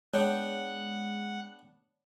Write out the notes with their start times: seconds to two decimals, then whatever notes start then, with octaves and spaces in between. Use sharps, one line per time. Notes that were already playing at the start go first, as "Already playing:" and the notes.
0.14 G#3 B3 D4 C#5 F#5 G5